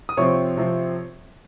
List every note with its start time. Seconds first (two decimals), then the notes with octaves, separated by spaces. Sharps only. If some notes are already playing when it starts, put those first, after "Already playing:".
0.09 D#6
0.17 C3 F3 C4 C#5 C#6
0.57 C3 F3 C4